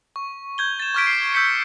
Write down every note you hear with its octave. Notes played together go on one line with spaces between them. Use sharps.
C#6
G6 G#6 G7
A6 E7
C#6 D6 F6 G#6 B6 D7
C7
E6 G6 G#6 B6 C#7 D7